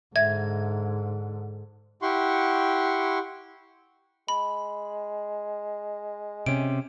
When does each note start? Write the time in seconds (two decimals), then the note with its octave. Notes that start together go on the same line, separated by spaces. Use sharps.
0.16 G#2 D3 E5 G#6
2.02 E4 G4 F#5 C6 C#6
4.28 G#3 B5
6.46 C3 C#4 D7